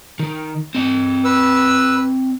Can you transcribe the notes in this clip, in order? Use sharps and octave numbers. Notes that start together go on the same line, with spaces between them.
D#3
C4 D#5
B4 E6